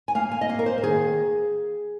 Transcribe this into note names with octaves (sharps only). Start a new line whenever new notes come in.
G#5
A#3 F5
G#5
D#5
A#3 F5
A#4
C5
A#4
D#3 G#4